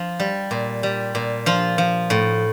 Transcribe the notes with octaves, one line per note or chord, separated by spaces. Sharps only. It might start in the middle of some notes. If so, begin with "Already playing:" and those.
Already playing: F3
G3
A#2
G3
A#2
F3 F4
F3
A2